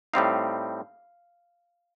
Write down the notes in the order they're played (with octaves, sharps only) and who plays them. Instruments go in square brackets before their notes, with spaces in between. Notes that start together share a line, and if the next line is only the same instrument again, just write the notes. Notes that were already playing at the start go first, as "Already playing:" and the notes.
[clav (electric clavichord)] A2 G3 C4 D#4 F5